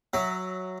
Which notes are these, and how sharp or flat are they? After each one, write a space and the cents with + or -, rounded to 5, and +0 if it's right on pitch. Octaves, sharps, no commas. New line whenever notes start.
F#3 +0 E5 +0